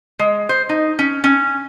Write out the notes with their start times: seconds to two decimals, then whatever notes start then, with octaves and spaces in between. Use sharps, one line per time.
0.19 G#3
0.49 C5
0.69 D#4
0.99 C#4
1.24 C#4